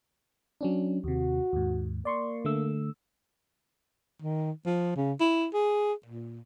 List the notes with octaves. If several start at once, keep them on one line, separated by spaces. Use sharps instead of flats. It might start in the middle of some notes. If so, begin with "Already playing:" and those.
F#3 C#4 D4
D#2 C3 F#4
D#2 G#2
A#3 D5 C6 C#6
D3 A3 E6
D#3
F3
C#3
E4
G#4
A#2